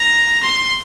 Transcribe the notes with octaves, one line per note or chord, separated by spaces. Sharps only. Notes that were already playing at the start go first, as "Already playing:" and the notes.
Already playing: A#5
C6